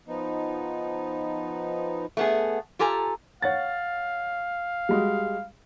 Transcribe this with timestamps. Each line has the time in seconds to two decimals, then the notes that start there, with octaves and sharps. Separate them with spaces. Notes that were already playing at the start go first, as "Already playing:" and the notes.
0.08 F3 B3 D#4
2.17 A3 B3 G#4
2.79 F4 G4 A4 G#5 A#5
3.42 C#5 F5 F#5 A6
4.89 G3 G#3 F#4